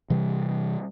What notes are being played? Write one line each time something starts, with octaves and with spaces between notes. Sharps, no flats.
C3 E3 G3